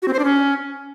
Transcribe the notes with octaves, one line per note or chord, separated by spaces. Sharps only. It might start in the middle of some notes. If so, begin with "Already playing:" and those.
F#4
C4
C5
D4
C#4